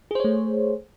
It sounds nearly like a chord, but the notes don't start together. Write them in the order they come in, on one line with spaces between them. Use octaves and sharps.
G#4 C5 C#5 A3